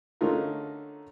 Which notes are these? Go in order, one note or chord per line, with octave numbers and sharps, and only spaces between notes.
D3 A3 C#4 D#4 F4 A#4